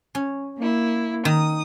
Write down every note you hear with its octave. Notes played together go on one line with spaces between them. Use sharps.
C#4
A#3 E4
D#3 D#6